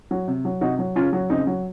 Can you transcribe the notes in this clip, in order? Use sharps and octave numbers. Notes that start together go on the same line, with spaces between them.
F#3
C3
F#3
C3 D#4 F#4
F#3
C#3 C#4 F4
F#3
C#3 C4 D#4
F#3